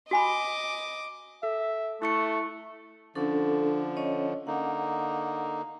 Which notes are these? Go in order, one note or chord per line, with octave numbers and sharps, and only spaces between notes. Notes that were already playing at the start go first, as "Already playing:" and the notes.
F#4 D#5 G#5 B5 D6
A4 E5
A3 E4 C#6 C#7
D3 F3 C#4 D4 A4
C#4 C#5 D#5
D3 A#3 D#4 F#5